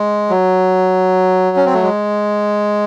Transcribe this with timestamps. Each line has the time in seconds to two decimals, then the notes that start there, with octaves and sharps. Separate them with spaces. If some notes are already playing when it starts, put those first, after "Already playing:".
Already playing: G#3
0.30 F#3
1.56 C#4
1.66 C4
1.74 A3
1.82 G#3